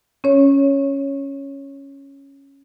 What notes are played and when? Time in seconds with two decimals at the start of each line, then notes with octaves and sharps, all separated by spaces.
0.24 C#4 C#5